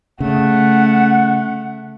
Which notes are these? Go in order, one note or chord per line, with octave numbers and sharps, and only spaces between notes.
C#3 A3 F#5